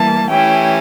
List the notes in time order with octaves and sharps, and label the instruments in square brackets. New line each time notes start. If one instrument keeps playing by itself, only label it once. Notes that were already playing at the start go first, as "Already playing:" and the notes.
Already playing: [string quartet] E3 G3 A#3 [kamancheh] A5
[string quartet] E3 A3 C#4 E4 G4 [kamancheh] G5